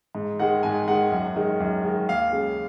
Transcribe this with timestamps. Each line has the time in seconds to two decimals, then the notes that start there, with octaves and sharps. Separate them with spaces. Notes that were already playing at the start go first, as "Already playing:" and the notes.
0.15 G#2
0.39 D#3 G#3 F#5
0.63 G#2 G#5
0.88 D#3 G#3 F#5
1.12 F#2
1.36 D#3 G#3
1.60 F#2
1.84 D#3 G#3
2.09 D#2 F5
2.33 C#3 G#3